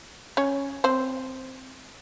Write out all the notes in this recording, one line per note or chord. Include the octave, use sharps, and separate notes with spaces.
C#4 C#5
C4 C5